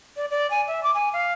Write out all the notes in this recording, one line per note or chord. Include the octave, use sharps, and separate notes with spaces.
D5
D5
G#5
E5
D6
G#5
F5